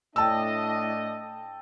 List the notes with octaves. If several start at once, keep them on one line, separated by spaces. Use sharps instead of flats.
A2 D4 D#5 G5 A5 E6